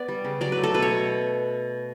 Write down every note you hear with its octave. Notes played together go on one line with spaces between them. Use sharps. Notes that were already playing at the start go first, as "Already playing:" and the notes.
Already playing: B3 D5
G3
C#3
F#3 D5
B4
A3
A4
B2 B4
C#5
B2